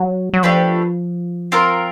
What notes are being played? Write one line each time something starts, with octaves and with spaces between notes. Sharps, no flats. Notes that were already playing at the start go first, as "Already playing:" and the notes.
Already playing: F#3
F#3
F3 A3 D4 G4 B4
C4 F4 A#4